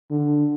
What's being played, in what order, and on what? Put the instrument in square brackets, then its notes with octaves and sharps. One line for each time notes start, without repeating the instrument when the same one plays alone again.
[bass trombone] D3